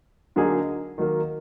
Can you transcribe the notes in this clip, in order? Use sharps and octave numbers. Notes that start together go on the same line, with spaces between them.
D3 F#3 A#3 D#4 G#4
D#3 F#3 A#3